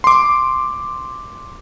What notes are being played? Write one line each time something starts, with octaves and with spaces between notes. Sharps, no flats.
C6 D6